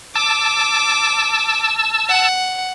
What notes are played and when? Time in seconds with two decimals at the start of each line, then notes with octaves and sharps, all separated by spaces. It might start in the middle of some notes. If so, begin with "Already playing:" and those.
0.15 A5 D6 E6
2.09 F#5